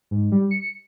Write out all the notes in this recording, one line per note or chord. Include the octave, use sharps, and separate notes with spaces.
G#2
G3
C#7